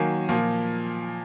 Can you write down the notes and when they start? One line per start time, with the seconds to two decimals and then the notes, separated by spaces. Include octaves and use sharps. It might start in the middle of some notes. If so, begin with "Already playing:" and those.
Already playing: D#3 F#3 A#3 G#5
0.29 A#2 F3 A#3